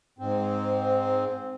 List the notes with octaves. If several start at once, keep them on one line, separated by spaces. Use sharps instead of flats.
G#2 C4